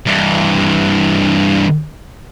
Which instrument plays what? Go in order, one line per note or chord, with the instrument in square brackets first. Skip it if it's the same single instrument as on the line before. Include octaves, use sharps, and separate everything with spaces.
[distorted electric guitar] G2 E3